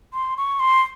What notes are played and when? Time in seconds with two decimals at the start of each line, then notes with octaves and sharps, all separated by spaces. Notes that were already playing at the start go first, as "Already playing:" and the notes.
0.13 C6
0.37 C#6
0.60 C6